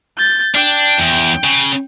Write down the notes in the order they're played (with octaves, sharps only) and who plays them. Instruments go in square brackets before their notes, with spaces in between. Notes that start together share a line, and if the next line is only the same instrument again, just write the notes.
[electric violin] G6 A6
[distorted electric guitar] D4 [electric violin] G5
[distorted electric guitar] E2
C#3